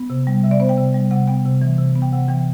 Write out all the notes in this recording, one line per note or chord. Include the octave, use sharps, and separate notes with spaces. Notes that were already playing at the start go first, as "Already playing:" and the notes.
Already playing: B3
C3
G3
C3 E5
D5
B3 C5
G5
C3
G3
C3 F#5
B3 G5
C3
E3
C3
B3
G5
C3 F#5
E3 G5